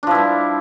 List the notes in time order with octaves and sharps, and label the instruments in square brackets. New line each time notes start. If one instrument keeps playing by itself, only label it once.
[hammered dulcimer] D4
F3
E4
G3